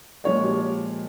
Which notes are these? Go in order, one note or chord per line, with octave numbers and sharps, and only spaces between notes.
A#2 F3 G#3 C#5
G4